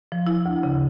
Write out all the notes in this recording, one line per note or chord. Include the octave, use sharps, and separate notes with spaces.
F3
E4
D2
C#3